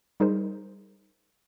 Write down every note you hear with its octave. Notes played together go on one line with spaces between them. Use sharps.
G3 D#4 G#4 A#4 C5